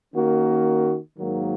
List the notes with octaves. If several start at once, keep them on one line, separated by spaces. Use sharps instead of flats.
D#3 A#3 C#4 F#4
G#2 D#3 F#3 A#3